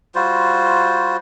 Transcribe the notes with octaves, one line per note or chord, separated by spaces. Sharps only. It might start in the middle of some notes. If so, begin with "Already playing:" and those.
G3 F4 F#4 C5